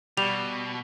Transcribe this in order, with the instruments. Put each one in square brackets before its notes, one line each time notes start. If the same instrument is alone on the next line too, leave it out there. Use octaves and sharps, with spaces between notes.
[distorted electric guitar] B2 [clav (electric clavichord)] G3 [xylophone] F7